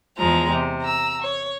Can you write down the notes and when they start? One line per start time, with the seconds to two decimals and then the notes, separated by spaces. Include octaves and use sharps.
0.17 E2 F3 G#3 A#5
0.50 C3
0.81 A#5 E6
1.22 C#5